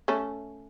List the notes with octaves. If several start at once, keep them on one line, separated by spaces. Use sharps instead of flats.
A3 C#4